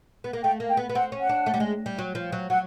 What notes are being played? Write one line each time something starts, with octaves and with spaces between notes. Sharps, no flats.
B3
A#3
A3 G5
A#3
G5
B3
B3
C4 F#5
C#4
F#5
D4
A3
G3
G#3
G3
F#3
F3
F#3
F#3 F#5